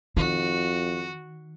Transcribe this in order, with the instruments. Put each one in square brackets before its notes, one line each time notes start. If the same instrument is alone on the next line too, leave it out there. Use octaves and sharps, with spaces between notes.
[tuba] F2 [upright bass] D#3 [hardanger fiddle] F#4